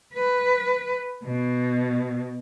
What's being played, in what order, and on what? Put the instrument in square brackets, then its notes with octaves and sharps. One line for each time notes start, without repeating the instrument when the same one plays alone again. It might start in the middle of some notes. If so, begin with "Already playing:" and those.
[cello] B4
B2